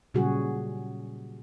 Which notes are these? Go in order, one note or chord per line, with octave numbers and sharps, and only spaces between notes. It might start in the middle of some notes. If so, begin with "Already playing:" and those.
A#2 C#3 F#3 G3 F#4 G#4